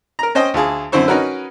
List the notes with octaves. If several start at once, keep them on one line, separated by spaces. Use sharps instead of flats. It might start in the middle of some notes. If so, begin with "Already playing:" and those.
A#4 A#5
C#4 C5 D#5 G5
D2 F4 G#4 A5
F#2 D3 C4 E4 C5 C#6
C#4 D#4 F#4 A#4 B4